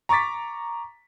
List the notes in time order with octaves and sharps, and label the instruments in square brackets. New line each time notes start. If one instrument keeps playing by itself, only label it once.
[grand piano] A#5 C#6 D6 A6 B6